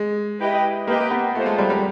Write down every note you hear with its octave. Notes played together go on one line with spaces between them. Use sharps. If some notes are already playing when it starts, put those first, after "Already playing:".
Already playing: G#3
E4 G4 B4 D#5 G5
A#3 G4 B4 D#5 G5
B3
A3 F4 A4 C5
G#3
G3
G3